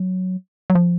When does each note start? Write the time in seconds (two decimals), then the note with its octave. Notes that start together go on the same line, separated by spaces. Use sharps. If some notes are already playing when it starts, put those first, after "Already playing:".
Already playing: F#3
0.70 F#3
0.75 F3